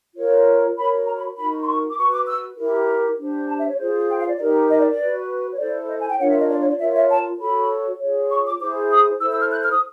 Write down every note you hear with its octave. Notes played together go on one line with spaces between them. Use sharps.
F4 A#4 C#5
F#4 A#4 C#5 B5
A#5
B5
D#4 F#4 A#4 B5
C6
C#6
D6
F#4 B4 C#6
D6
E6
E4 G4 A#4
D4 G4 C5
A5
E5
C#5
F4 G#4 C5
G5
F5
D5
D#4 G4 A#4 D5
D#5
D5
D5
F#4 B4
C#5
E4 A4 C5 D5
D#5
G#5
G5
D4 F4 A#4 C#5 F#5
E5
D#5
D5
C#5
D5
F4 A#4 C#5 E5
E5
A5
F#4 A4 C#5 B5
F4 G#4 C#5
C#6
D6
E4 G#4 C5 D6
D#6
E4 A4 C5 E6
E6
F6
F#6
F6
D#6